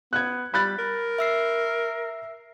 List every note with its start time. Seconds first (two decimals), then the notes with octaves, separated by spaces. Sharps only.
0.13 B3 F#6 G#6
0.54 G3 B5 F#6 A6
0.79 A#4
1.18 E5 E6 C7